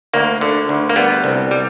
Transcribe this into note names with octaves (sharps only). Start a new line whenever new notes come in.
D2 A#3
D3
D2
A#3
G3 B3
C2
G3